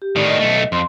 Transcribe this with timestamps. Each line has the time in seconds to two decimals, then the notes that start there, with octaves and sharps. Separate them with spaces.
0.02 G4
0.16 A2 D#3 D5
0.27 D#5
0.40 B1 A3
0.72 F2 C6